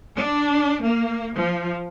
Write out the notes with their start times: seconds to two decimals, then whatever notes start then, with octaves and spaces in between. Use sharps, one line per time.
0.17 D4
0.83 A#3
1.36 F3